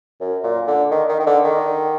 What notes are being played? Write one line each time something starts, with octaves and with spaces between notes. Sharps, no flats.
F#2
A#2
D3
D#3
D#3
D#3
D3
D#3